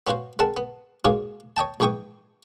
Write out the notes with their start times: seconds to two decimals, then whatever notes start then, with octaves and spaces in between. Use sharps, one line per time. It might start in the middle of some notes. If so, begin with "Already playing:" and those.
0.07 B3 C#4 F4 F#4 C5
0.39 G#3 C4 A#4 F#5 A5
0.57 B3
1.05 G#2 B2 A#3 C#4 F4 G#4
1.57 C#5 D#5 G5 A5
1.80 A#1 G#2 E3 G5 C#6 D#6